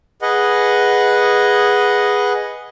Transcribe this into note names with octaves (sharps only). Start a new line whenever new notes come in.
G#4 B4 D#5 F#5